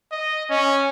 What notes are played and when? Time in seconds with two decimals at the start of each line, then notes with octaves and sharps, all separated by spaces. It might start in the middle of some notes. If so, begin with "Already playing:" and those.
0.12 D#5
0.50 C#4